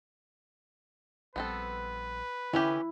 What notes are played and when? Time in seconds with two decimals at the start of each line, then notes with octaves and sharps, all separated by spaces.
1.36 A#1 G3 B3 C4 A4 B4
2.53 D3 E3 C#4 E4 G4